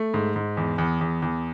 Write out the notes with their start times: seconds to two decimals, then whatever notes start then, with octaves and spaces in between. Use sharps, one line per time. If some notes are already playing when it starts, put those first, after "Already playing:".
Already playing: A3
0.14 G#2
0.36 G#2
0.57 E2
0.78 E2
1.01 E2
1.22 E2